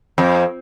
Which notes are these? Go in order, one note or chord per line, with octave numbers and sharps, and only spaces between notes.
F2